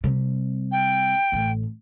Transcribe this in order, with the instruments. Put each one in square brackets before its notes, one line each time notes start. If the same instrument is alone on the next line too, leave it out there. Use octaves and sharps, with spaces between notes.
[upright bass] C3 G3
[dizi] G5
[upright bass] A1 A2